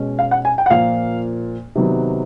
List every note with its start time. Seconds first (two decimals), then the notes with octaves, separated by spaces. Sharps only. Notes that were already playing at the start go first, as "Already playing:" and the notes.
Already playing: B2 G#3 C#4
0.19 F5
0.31 F#5
0.45 G#5
0.58 G5
0.66 F#5
0.70 A#2 F3 A#3 F5
1.75 C3 D#3 F#3 B3